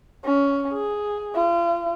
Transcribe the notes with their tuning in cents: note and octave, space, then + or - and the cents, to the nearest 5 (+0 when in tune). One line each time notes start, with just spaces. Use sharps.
C#4 +15
G#4 +0
F4 -35